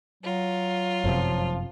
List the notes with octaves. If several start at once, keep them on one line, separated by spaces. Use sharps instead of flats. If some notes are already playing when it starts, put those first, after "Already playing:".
F#3 F4
G1 F#2 C3 F3